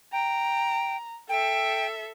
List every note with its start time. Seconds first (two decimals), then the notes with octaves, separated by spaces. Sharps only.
0.13 G5 A#5
1.29 A4 E5 G5